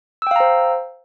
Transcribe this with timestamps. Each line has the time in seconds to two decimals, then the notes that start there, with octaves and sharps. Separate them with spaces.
0.22 E6
0.27 G5
0.31 F5
0.36 A#5
0.40 C5